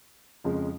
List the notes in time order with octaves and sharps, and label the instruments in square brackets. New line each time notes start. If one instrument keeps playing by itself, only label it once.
[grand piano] F2 C#3 F3 G#3